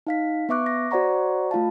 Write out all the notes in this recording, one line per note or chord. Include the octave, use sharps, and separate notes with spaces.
D#4 F5 B6
B3 B4 E5 C#6 D6 F#6
A#6
F#4 C5 D5 F#5 A#5 C#6
A3 F4 F5 A5